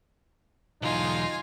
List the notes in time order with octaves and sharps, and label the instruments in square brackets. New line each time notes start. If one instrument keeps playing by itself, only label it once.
[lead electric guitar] B1 E2 [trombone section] D#4 [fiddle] F4 G#5